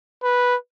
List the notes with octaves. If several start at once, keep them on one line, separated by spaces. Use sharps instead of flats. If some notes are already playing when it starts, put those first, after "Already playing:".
B4